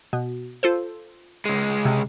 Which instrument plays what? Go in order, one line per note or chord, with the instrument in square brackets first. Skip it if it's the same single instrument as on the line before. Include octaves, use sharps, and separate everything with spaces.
[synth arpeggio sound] B2
F4 A4 C5
[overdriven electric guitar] C#2 G#3
[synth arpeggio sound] C3